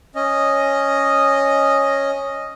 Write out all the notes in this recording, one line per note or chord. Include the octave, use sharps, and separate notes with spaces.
C#4 D#5